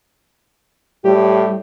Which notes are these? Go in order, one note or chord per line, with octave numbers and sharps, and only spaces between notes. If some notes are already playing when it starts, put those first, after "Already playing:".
A2 G3 G4